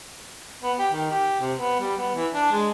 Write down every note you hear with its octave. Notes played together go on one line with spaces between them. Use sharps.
B3
G4
D#3
G4
C3
B3
G3
B3
E3
D4
G#3